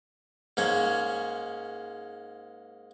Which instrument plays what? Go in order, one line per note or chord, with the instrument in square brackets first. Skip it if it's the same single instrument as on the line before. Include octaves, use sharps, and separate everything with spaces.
[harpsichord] G#2 A#3 C#4